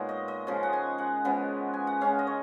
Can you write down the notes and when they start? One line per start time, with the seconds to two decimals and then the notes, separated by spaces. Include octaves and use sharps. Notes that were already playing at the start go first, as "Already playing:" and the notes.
Already playing: A#2 G#3 B3 D#4 C#5
0.09 D#5
0.28 D#5
0.47 C#3 F3 G#3 C#4
0.63 F#5
0.73 G#5
0.98 F#5
1.25 C#3 F3 G#3 B3
1.74 G#5
1.87 F#5
2.01 C#3 G#3 C#4 F5
2.19 D#5
2.27 C#5